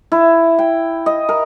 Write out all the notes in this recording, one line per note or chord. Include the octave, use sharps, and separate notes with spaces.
E4
G5
D#5
A#4